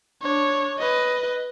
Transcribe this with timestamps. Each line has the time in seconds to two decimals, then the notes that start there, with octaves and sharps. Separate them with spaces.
0.22 D4 C#5
0.79 B4 D#5